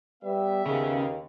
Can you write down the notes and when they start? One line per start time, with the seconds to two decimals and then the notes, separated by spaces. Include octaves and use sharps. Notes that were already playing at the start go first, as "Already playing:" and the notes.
0.23 G3 B3 B4 E5
0.66 D#2 C#3